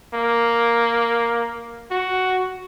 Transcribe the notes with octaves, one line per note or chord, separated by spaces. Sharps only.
A#3
F#4